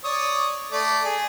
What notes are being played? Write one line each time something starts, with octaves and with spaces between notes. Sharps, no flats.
C#5 D5 D#6
A3 D5
G#4